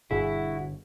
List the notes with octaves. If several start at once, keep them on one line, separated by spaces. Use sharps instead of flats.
G1 G2 B2 E4 F#4 G#4